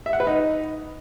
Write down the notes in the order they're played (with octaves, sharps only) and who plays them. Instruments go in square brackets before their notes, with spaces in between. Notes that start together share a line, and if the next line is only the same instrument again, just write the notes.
[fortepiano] E5
F#5
B4
D#4